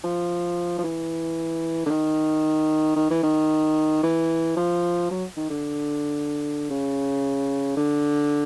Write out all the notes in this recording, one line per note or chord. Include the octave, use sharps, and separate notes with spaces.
F3
F3
E3
D3
D#3
D#3
E3
D#3
E3
F3
F#3
D#3
D3
C#3
D3